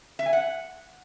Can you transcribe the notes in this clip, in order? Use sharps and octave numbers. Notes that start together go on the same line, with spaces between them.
E5
G#5
F#5